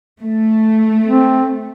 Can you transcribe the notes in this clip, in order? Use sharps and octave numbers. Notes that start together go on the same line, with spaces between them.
A3
C4